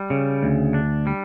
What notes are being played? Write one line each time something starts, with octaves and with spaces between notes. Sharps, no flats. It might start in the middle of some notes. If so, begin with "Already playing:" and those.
Already playing: G3
C#3
D2
D4
G3